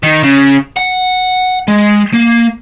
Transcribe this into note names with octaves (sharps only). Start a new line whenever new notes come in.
D#3
C#3
F#5
G#3
A#3